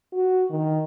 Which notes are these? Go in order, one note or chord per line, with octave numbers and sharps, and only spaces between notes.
F#4
D#3